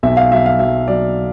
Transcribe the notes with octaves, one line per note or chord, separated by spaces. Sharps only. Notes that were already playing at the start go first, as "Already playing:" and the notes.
B1 E5
F5
F#3 E5
F5
F#3 E5
F#3 D5